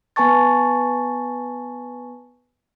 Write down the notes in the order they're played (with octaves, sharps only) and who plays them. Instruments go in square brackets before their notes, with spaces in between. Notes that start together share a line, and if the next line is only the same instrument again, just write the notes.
[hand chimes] B3 B4 G#5 A5 C#6 A6